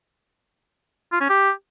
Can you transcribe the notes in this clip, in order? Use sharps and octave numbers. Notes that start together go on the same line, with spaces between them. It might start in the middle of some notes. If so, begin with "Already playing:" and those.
F4
C#4
G4